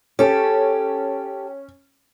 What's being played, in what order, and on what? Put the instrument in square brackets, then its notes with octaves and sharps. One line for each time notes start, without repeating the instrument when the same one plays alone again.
[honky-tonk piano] C#4 [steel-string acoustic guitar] G4 A4